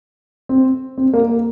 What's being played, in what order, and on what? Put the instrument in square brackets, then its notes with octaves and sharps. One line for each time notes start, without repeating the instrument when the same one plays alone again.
[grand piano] C4
C4
A#3
A#3